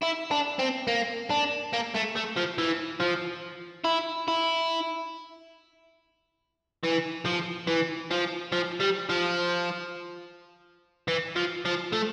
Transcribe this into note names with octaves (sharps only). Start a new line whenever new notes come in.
E4
D4
C4
A#3
D4
A#3
A3
A3
F3
E3
F3
E4
E4
E3
F3
E3
F3
F3
G3
F3
E3
F3
F3
A3